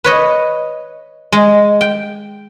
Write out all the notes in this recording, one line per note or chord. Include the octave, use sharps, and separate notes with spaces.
B4 C#5 D#5
G#3
G5